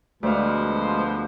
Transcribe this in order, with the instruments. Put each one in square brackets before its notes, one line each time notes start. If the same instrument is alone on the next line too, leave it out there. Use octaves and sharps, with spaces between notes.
[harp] D2 F5 [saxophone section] B2 F3 C5 [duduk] G#3